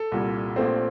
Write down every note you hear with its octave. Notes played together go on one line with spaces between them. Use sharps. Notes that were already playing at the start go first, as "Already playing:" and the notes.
Already playing: A4
C2 A#2 G3
A#1 A#2 A3 C4